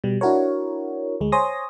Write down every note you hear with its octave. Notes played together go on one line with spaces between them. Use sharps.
B2 G3
D4 E4 F#4 A#4 C#5
D2 G#3
C5 C#5 G#5 C6 D#6 A#6